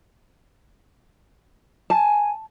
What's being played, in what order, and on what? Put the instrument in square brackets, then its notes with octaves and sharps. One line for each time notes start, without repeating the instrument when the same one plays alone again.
[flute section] G#5 [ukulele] A5